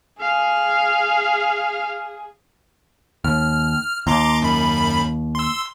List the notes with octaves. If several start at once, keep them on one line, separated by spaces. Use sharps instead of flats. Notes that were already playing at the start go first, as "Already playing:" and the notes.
G#4 F5
D#2 F6
D#2 A#5 C6 D6
F#2 B5
C6 E6